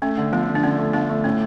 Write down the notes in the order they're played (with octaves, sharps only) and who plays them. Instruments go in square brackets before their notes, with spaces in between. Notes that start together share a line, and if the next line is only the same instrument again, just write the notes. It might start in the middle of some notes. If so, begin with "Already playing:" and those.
[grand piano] A3 [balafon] C#4
[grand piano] D3
[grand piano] F3 [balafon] B3
[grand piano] D3
[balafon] D4
[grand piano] D3 [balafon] C#4
[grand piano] A3
[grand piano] A3 [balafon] B3 D4
[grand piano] A3
[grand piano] A2 [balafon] C#4